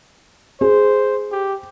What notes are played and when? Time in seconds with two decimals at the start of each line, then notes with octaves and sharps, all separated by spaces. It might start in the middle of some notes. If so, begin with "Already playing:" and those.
0.61 G#4 C5
1.32 G4